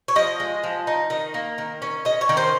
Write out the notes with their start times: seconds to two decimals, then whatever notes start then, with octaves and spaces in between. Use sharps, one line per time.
0.08 C#5
0.16 F3 D#5
0.40 G#3
0.64 F3
0.87 D#4
1.10 D#3 D#5
1.34 A#3
1.58 D#3
1.82 C#4
2.05 C#4 D#5
2.21 C#5
2.29 D#3
2.37 C5